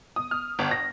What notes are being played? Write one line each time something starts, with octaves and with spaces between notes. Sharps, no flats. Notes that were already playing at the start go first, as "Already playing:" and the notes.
D#6
F6
G1
A#6